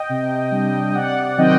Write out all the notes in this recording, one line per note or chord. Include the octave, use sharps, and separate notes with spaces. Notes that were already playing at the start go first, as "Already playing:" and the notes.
Already playing: D#5 G5
C3
G3 D4
D#5
C3 D5 F#5
D#3 F#3 C4 D#5 G5